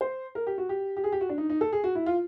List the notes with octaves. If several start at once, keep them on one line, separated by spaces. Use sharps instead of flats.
C5
A#4
G4
F#4
G4
G4
G#4
G4
F#4
D4
D#4
D#4
A4
G#4
F#4
E4
F4